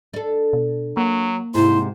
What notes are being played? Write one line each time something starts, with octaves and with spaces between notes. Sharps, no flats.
D4 A4
B2
F#3 A#3
G#2 C3 E4 C5